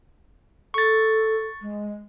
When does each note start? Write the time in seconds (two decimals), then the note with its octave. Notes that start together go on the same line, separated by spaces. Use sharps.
0.74 A4 C#6 A6
1.61 G#3